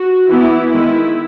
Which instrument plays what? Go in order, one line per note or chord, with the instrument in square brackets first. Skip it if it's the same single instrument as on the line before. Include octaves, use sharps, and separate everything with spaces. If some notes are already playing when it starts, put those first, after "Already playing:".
Already playing: [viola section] F#4
E3 B3 E4
D#3 G#3 B3 E4